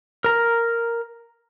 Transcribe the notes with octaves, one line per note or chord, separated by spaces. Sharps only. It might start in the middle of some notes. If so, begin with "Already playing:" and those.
A#4 A#5